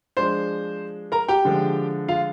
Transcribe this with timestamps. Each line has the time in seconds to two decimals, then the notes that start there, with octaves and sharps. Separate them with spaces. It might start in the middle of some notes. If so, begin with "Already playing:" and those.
0.17 F3 G#3 D4 C5 C6
1.12 A#4 A#5
1.29 G4 G5
1.45 D3 F3 G#3
2.08 F4 F5